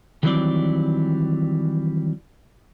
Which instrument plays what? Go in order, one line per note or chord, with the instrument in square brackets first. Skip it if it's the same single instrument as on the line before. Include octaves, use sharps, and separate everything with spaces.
[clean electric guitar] D#3 E3 F#3 G3 C4 D5